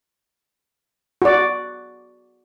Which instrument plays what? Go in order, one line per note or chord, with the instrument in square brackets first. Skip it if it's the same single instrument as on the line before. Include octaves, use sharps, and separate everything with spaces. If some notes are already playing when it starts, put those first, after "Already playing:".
[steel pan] F#4 D5